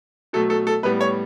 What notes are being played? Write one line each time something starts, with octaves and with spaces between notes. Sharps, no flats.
B2 F#3 A3 A4
A4
A4
A2 G3 B3 B4
C#5